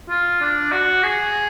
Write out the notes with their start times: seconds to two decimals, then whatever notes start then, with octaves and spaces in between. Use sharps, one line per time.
0.09 F4
0.41 D4
0.72 F#4
1.03 G#4